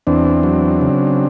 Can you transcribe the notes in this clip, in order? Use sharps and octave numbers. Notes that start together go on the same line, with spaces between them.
E2 C4 D4
F#3
C#3